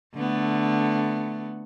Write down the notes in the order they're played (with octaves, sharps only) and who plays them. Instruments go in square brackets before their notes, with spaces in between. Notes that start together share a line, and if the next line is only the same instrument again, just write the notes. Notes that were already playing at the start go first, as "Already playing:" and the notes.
[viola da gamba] D3 A3 B3